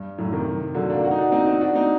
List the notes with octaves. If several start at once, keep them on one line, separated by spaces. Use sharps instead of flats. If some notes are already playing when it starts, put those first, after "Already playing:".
Already playing: G2
F#2 A2
C3 D#3
D3 F#3
A#3 D4
F#4
D#4
D4 F#4
C4 D#4
C4 D#4
D4 F#4
C4 D#4